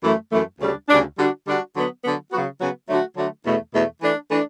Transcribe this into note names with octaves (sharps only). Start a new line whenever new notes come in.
F#2 E3 A3
F#2 E3 A3
D2 C#3 G3 D4
D2 C#3 G3 D4
D3 G3 D4 F#4
D3 G3 D4 F#4
D3 F#3 B3
D3 F#3 B3
C#3 F#3 B3 F#4
C#3 F#3 B3 F#4
D3 F#3 A3 D4 F#4
D3 F#3 A3 D4 F#4
E2 B2 A3
E2 B2 A3
E3 A3 D4
E3 A3 D4